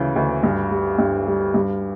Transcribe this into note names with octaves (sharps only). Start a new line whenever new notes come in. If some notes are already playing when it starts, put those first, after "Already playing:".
Already playing: D2 C#3 E3
D2
G2
G3
G2
G3
G2